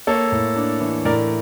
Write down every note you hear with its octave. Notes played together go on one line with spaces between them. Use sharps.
A#3 A4 C#5
A2
D4
E3
A2 A#4 D5